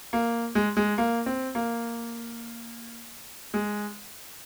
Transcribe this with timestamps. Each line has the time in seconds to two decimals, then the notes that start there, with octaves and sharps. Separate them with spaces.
0.13 A#3
0.55 G#3
0.77 G#3
0.98 A#3
1.26 C4
1.55 A#3
3.54 G#3